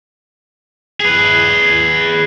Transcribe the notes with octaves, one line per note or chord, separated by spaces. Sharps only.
G#4 B4